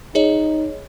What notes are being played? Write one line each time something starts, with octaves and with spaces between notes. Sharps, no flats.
D#4 G#4 C#5 D#5